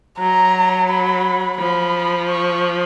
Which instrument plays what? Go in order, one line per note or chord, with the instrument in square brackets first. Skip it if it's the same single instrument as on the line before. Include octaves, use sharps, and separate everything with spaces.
[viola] F#3 [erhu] A#5
[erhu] B5
[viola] F3 [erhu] B5
[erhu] C#6